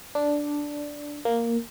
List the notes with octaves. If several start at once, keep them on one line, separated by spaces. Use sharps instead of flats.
D4
A#3